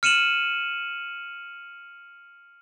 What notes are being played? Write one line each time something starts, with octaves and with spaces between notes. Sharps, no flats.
F6 C#7 D#7 E7 F#7